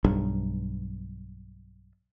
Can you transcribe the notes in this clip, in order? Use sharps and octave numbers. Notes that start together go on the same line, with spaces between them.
B1 G2